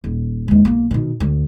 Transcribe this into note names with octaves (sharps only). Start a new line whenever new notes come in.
D#1
D#2 G#3
B1 A#3
B2 D#3
D2